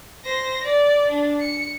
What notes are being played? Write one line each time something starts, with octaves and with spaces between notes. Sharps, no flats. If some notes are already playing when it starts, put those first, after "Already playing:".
C5 A#6
D5
D4
C#7